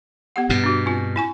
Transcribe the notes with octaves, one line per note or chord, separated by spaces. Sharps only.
B3 G4 F#5
G2 B2
D4 F#4
C4 F4
E4 G#5 C#6